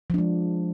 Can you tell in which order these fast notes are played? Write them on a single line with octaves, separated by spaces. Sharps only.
F3 D4 G#3